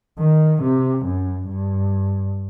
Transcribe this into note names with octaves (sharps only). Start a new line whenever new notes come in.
D#3
C3
F#2
G2